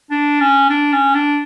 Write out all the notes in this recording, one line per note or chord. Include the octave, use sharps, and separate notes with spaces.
D4
C#4
D4
C#4
D4